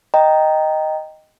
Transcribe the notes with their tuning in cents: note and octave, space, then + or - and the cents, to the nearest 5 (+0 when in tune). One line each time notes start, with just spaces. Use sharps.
D#5 +0 G5 +0 A#5 -5